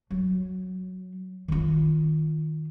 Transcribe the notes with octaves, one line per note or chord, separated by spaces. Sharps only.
F#3
D#3 F4